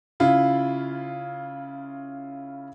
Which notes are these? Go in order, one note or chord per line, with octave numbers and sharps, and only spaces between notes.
C#3 E4 F4